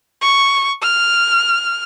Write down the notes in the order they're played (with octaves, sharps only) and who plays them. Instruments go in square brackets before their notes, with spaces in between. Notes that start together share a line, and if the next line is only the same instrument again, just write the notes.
[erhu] C#6
F6